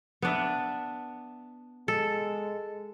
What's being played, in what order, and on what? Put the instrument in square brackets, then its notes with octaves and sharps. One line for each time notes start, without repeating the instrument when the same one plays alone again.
[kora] B3 D4 E5
[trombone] G#3 [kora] A4